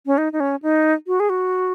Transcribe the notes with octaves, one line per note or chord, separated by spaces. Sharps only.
C#4
D#4
D#4
C#4
D#4
F#4
G#4
F#4